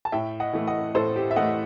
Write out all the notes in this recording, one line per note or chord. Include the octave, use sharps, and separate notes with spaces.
A5
A2 E5 G5
D#5 F#5
E3 A3
D#5 F#5
A2 A4 C5
G4
E5
E3 A3 D#5 F#5